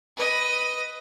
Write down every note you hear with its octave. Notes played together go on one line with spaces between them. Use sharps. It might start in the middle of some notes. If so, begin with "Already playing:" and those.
B4 D#5